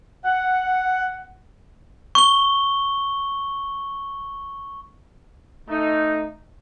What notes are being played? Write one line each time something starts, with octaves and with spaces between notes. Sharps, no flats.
F#5
C#6 G7
A3 D#4